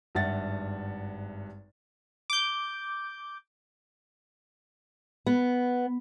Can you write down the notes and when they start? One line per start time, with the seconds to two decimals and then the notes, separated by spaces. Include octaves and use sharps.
0.15 G#1 G2 E5 F#5 A6
2.30 D6 G6
5.26 B3